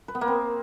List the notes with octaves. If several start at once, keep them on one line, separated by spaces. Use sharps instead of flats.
B4
B3
A#3
C4